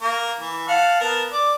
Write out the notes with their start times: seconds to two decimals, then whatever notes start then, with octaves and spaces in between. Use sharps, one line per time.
0.02 A#3 A#4
0.38 E3
0.68 F5 F#5 A5
1.00 B3 A#4 A5
1.32 D5